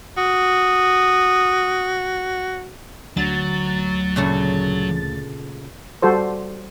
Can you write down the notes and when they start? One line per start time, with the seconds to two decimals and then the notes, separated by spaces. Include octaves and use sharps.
0.17 F#4 D#6
3.17 D2 F#3 A6
4.16 A#2 C#3 A3
6.02 G3 F#4 A4 C5